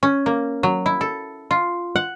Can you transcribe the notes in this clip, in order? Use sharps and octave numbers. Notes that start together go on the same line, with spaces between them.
C#4
A#3
F#3
E4
A4
F4
F#5